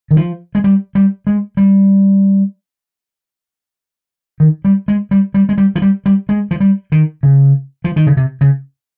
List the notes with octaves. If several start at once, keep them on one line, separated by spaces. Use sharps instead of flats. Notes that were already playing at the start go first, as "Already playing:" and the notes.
D#3
F3
G#3
G3
G3
G#3
G3
D#3
G3
G#3
G3
G3
G#3
G3
F3
G3
G3
G#3
F3
G3
D#3
C#3
F3
D#3
C#3
C3
C#3